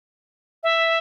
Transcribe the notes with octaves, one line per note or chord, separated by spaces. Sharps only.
E5